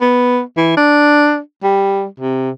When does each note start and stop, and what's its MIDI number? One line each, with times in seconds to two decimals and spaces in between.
0.01 0.41 59
0.57 0.75 52
0.77 1.39 62
1.64 2.06 55
2.20 2.51 48